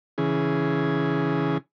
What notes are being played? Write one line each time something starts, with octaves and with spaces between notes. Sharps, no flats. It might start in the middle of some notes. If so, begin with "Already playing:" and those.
C#3 E3 G#4